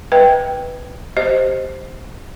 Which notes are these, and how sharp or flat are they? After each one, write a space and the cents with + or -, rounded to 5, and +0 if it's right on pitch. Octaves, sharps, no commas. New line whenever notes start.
B4 +0 D#5 +20 G5 +0
G4 +0 C5 +0 D#5 +0